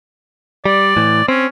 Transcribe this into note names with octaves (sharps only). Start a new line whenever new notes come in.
G3 D5
A2 E3
C4 C#4